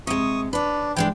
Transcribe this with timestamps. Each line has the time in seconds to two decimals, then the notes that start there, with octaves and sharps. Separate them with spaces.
0.07 C3 G#3 C#6 D#6
0.53 D4 B4 C#5
0.96 E3 G#3 D4 G5